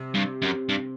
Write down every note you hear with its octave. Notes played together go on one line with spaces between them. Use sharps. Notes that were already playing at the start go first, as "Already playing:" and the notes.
Already playing: C3
G2
F#2
G2